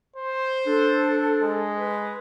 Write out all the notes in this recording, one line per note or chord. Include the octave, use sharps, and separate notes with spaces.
C5
D4 A4
G#3
B4